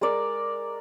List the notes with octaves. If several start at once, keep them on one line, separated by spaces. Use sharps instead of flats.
G#3 A#4 D5